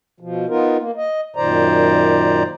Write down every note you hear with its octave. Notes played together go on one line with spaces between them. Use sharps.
B2 F3
B3 D#4 F4 A#4
A#3
D#5
F#2 A#2 D#3 C5 D5 A#5